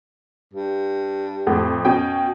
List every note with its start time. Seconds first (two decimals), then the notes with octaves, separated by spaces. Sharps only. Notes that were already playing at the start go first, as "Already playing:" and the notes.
0.53 G2
1.47 F2 A2
1.85 B2 C#4 G5